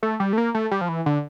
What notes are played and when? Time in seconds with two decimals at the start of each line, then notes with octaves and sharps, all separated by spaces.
0.03 A3
0.20 G3
0.33 A3
0.38 A#3
0.55 A3
0.71 G3
0.81 F3
0.89 E3
1.06 D3